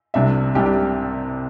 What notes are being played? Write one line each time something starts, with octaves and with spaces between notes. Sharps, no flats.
C2 C3 G3 D4 E5
C2 C3 G3 D4 G4
G4